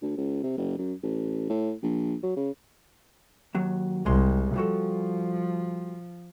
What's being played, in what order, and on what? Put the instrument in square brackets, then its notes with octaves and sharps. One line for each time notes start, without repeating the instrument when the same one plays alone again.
[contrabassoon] D2
C#2
C3
F#1
F#2
A1
A2
A#1
F#3
C#3
[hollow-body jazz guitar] D#2 F#3
[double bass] C2 [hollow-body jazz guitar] C3 G#3 C6
[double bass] F3 [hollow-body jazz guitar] G3 F#4 A4